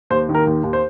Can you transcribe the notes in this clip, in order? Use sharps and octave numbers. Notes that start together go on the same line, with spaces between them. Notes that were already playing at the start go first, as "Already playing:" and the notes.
D#2 C5
D#3
A#4
D#2
D#2
C5